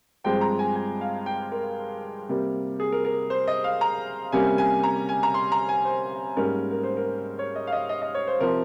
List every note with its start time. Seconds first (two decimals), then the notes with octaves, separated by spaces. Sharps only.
0.24 G2 F3 G#3 C4 G5
0.41 A#5
0.59 G#5
0.76 G#5
1.01 F5
1.26 G5
1.52 A#4
2.29 C3 G3 A#3
2.80 G#4
2.92 A#4
3.05 A#4
3.30 C5
3.48 D#5
3.64 F5
3.81 A#5
4.32 C3 G3 A#3 C#4 G#5
4.58 G#5
4.84 A#5
5.09 G#5
5.23 A#5
5.34 C6
5.52 A#5
5.69 G#5
5.85 C5
6.36 G#2 G3 A#3 C#4 A#4
6.71 A#4
6.83 C5
6.97 A#4
7.39 C#5
7.56 D#5
7.67 F5
7.72 D#5
7.89 D#5
8.02 D#5
8.15 C#5
8.27 C5
8.40 C3 F3 C4 A#4